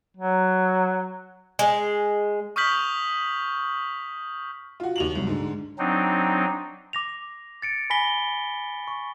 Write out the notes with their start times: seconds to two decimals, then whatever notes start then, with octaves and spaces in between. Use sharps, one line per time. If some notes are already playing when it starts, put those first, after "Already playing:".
0.17 F#3
1.59 G#3
2.56 C#6 D#6 F6 G6 B6 F#7
4.80 F4 F#4
4.96 D#2 F7 F#7
5.15 C2 F#3
5.27 G#2 D3
5.79 F#3 C4 D4 D#4
6.93 D6 A#6 F7
7.62 A6 C#7 D7
7.90 G#5 B5 A#6 B6 G7
8.88 C#6